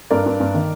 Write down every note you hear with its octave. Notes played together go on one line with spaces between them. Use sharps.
G2 A#4 D5
G2
G2
D#3